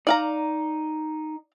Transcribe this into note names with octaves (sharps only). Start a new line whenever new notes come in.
D#4 D5 F5 A#5